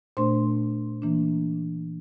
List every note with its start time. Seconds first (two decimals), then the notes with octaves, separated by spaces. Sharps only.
0.17 A#2 A3 D4 C5 C6
1.02 E3 A#3 D4